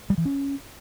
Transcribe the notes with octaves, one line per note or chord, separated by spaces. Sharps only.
G3
E3
C#4